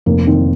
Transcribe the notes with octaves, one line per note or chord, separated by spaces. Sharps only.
F1 A#3
D#3 C4